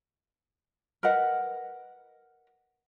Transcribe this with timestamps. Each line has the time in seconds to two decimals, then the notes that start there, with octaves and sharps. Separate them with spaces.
1.03 A#4 B4 D#5 F#5